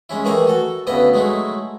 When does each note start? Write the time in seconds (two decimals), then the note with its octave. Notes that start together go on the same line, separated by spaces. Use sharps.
0.09 G#3 C#4 E4
0.24 D#3 E3 A3 G#4 A#4 C#5
0.47 F#4 A4
0.87 D2 C#3 B3 E4 B4 D#5
1.13 F#3 G#3 A3 D#4 E4